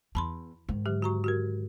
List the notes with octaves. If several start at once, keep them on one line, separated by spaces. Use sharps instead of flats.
E2 A5 B5 C6
G#2 D#3
D3 F#3 G4
F#4 A#5 C#6
F#4 G4 A#4